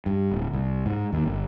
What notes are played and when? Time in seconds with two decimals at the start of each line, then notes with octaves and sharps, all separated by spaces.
0.06 G2
0.31 D1
0.53 C2
0.86 G#2
1.12 D#2
1.26 G1